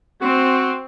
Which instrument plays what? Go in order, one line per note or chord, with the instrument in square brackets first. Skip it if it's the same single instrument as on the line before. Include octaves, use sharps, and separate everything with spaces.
[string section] C4 [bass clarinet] F#4